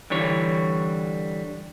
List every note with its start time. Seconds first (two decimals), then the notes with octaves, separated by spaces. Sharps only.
0.10 D3 E3 G3 C#5